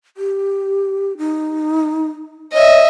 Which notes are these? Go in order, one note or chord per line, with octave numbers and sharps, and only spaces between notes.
G4
D#4
C#5 D#5 E5